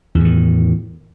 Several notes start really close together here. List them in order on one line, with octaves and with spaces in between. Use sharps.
E2 A2 D#3